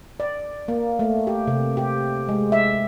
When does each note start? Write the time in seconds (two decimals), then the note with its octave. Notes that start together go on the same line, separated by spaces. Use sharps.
0.20 D5
0.68 A#3
0.99 A3
1.27 G4
1.47 C3
1.77 G4
2.29 G#3
2.52 E5